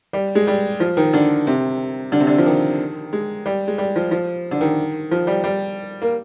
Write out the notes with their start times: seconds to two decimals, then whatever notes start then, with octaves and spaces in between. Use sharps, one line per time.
0.13 G3
0.35 G#3
0.47 G3
0.80 F3
0.97 D#3
1.14 D3
1.47 C3
2.12 D3
2.20 C3
2.27 D3
2.38 F3
2.46 D#3
3.13 G#3
3.46 G3
3.68 G#3
3.78 G3
3.96 F3
4.11 F3
4.51 D3
4.61 D#3
5.11 F3
5.27 G3
5.44 G3
6.02 A#3